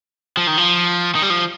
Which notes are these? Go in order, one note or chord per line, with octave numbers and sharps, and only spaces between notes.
F3
D#3
F3
D#3
G3
F3